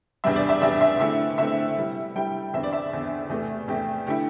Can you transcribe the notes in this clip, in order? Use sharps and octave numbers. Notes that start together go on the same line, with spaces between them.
E2 C3 G3 D4 E5
D5
E5
E2 C3 G3 D4 E5
E5
D3 A3 C4 E4 E5
D3 A3 C4 E4 E5
C3 G3 E4
C3 G3 E4 G5
E2 D3 C4 E5
D5
E5
E2 D3 C4
E2 C3 A3
E2 C3 A3 G4
D3 A3 E4 G4